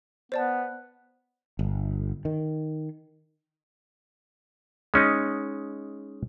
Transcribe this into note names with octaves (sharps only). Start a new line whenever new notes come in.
B3 C5 D5 A5
G1
D#3
G#3 C#4 D#4